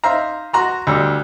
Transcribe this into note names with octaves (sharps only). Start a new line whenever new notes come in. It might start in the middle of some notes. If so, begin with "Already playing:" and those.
D#4 C5 E5 F5 A#5
F#4 A#5 C6
D2 G3 E6